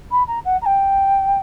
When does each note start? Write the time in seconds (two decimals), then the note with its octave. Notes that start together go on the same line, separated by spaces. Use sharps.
0.11 B5
0.27 A#5
0.45 F#5
0.61 A#5
0.65 G5